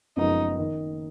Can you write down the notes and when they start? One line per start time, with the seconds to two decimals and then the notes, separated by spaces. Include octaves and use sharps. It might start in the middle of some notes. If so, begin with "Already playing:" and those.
0.17 F#1 F#2 F3 G#3 B3 D#4
0.58 D#3 A#3